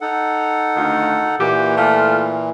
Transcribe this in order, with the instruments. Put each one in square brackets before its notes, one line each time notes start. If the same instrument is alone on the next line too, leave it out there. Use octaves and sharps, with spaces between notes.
[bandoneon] D#4 A4 F#5
[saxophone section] D2 D#3 F4
[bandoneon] A#2 E3 [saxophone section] A#3 F#4 G4
[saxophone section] A3 F4